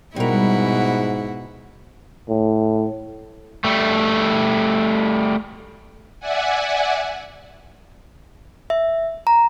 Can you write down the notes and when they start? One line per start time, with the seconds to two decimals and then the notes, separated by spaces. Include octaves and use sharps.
0.16 G#2 B2 G3 E4 A#4 F#5
2.29 A2
3.64 G3 A3
6.20 D5 E5 F#5 G#5
8.70 E5
9.27 A#5